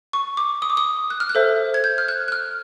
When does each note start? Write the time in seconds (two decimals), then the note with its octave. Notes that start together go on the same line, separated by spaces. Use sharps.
0.13 C#6
0.37 D6
0.62 D#6
0.70 D6
0.77 D#6
1.10 F#6
1.20 F6
1.29 F#6
1.35 A4 C5 E5
1.74 G#6
1.84 G6
1.98 F6
2.08 F#6
2.28 F#6
2.32 F6